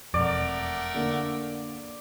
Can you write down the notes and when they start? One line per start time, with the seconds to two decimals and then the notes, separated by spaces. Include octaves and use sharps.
0.14 E1 F2 A3 A#4 D5 F#5
0.94 D3 A#3